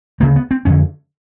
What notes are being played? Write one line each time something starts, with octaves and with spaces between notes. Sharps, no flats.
D2 C#3 A#3
B3
C4
F2 D3 C#4